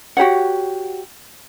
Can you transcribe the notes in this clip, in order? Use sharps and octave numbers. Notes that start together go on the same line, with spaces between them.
F#4 G4 C#5 F#5